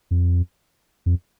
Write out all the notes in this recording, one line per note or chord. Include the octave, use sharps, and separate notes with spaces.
F2
F2